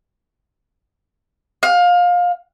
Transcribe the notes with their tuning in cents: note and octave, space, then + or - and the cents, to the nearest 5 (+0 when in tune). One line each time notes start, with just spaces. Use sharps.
F5 +25